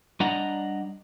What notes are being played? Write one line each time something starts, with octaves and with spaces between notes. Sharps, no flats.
G3 D4 D#5 F#5 A#5